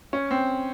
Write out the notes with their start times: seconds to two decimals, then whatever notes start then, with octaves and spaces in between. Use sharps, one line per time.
0.13 C#4
0.31 C4